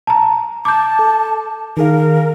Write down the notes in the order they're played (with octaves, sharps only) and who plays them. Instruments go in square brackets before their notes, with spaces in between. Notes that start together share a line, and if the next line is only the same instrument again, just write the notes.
[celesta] A5 A#5
[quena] A5 [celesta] D6 G6
[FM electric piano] A4
[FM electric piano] D#3 G#4 F5 [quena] A#4